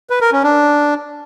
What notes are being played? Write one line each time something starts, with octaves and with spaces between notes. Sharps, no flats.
B4
A#4
C#4
D4